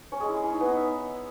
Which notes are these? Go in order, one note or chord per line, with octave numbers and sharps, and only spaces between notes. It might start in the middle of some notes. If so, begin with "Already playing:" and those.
C#4 C#5
G#3 G#4
E4
C#4
D#4
B3 B4
D#4 D#5
E5